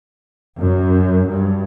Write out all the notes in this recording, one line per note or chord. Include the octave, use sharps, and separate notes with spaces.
F#2
G2